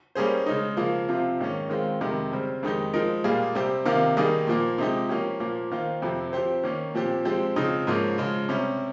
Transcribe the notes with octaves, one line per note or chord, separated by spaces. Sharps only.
G3 A#3 C#4 G#4 C5
C#3 G#3 D#4
C#3 F3 A#3 F4
C3 F3 C4 F4
G#2 D#3 A#3 C#4
D#3 G#3 C4 F4
F2 C3 D#3 G#3
C#3 G3 C4
F2 D#3 G#3 D#4 G4
F3 G#3 D#4 A#4
A#2 G3 A#3 F4 G#4
C3 G3 C4 G4
C3 D#3 A#3 F4
D#3 G3 A#3 D#4 G#4
A#2 F3 A#3
C3 F3 G#3 D#4 G4
F3 A#3 C#4 G4
A#2 F3 A#3
D#3 A#3 F4 C5
F2 C3 F3 C4
F3 C4 G4 C5
D#3 A#3 C#4
A#2 F3 C4 G4
F3 G#3 C4 G4
C#3 F3 C4 D#4
G#2 F3 A#3 C#4
C#3 F3 G#3
C3 G3 C#4